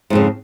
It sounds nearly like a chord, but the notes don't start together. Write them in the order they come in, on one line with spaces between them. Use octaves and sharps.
G#2 F2 C#3